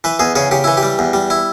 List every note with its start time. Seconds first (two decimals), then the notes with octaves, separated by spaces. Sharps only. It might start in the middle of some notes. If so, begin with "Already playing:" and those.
0.04 E3 B4
0.19 E2 G#4
0.36 C#3 G#4
0.51 C#3 G4
0.64 E3 E4
0.77 G4
0.83 G3
0.99 E2
1.13 G3
1.30 E4